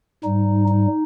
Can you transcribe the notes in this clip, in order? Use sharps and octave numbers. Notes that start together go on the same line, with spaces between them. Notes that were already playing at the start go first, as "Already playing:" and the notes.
G#2 G3 D#4
D#4